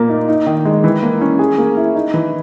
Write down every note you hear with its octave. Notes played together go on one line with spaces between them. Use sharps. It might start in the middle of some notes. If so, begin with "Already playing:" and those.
Already playing: A#2 A#3
D#4
D#4
D#3
G#3
E3
A#3
C#4
G#4
A#3
E4
D#4
E3